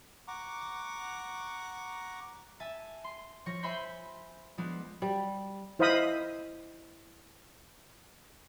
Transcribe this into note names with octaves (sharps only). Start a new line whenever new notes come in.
F#5 A#5 C#6 D6
E5 G#5 A5
C6
F3 C#5 C#6 A#6
C5 E5 G#5 B5 C6 G6
F3 G#3 B3 D4
G3
E4 C5 D#5 F5 B5 D#6